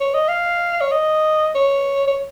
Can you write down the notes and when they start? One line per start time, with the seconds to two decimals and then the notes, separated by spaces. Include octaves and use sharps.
0.01 C#5
0.14 D#5
0.28 F5
0.81 C#5
0.92 D#5
1.55 C#5
2.08 C#5